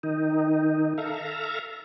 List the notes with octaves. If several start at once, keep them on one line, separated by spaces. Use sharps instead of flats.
D#3 D#4
A4 E5 F5 A#5